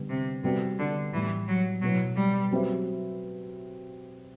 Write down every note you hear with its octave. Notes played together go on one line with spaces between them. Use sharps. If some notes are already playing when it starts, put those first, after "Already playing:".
Already playing: D3 G3 B3
C3
C3 G3 B3 F#4 A4
D3
A2 E3 G3 B3
F#3
B2 F#3 A3 E4 B4
G3
F#3 C4 G4 B4 E5